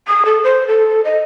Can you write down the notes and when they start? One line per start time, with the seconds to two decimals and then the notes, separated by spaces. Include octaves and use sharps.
0.08 D#6
0.25 A4
0.44 C5
0.67 A4
1.05 D#5